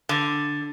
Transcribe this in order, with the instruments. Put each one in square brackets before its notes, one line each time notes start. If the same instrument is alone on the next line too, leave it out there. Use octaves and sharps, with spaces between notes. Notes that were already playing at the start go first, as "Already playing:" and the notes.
[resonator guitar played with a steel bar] D3